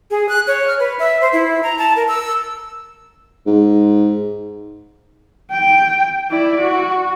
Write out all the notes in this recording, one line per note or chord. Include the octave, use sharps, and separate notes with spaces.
G#4
F#6
C#5
F6
B4
E5
C5
E4
A#5
A5
A#4
E6
G#2
G5
E4 D5
F#4